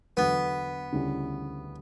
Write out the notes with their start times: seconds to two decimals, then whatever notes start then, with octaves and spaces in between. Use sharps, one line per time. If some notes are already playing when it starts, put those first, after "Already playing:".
0.17 E2 D3 F#3 B3
0.93 D2 C#3 G3 C#4 E4